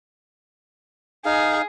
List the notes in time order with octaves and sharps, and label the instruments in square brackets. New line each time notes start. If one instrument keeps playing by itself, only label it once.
[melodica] D#4 F5 [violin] G#4